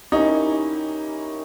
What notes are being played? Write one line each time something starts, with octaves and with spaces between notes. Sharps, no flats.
A#3 C#4 D#4 E4 G4